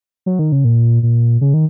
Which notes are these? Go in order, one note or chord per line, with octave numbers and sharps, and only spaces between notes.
F#3
D#3
C#3
A#2
A#2
C#3
D#3